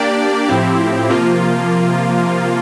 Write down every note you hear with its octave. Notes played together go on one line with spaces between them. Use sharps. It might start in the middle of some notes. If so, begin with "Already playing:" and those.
Already playing: A#3 D4 G4 D5
A2 F3 C4 E4 G4
C3 F3 A#3 F4